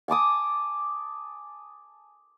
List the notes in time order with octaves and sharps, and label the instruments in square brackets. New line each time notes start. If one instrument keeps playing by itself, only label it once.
[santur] G#5 A5 D6 D#6